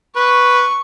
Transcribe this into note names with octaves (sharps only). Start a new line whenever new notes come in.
B4 C#6